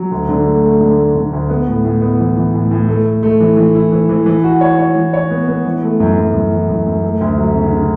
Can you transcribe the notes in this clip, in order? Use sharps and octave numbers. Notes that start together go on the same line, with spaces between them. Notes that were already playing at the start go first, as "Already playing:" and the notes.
Already playing: F#3
D2
D3
A3
A3
D3
A3
D3
D2
B3
A2
A2
B3
E3
E3
A2
A2
A3
A3
A3
E3
E3
E4
E3
E3
E3
F#4
C#5
C#5
E3
C#5
B3
B3
E3
A3
F#2
F#2
F#2
E3
F#2
F#2
A3
D2
F#3
C#3
C#3